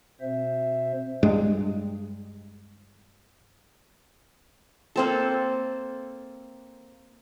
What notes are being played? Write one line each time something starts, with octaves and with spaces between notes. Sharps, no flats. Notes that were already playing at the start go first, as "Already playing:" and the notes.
B2 C4 C5 E5
G2 G#3
A#3 C4 A4